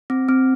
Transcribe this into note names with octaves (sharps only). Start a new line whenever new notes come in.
C4
C4